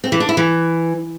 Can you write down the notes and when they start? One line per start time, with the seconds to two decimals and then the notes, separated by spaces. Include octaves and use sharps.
0.04 C4
0.12 E3
0.20 D4
0.29 E4
0.37 E3